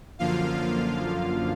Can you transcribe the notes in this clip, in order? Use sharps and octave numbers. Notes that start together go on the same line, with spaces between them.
F#2 D3 F3 A#3 F4 F5